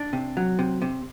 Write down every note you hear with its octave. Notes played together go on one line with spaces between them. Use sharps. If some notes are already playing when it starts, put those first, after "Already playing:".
Already playing: D4
C3
F#3
C3
C3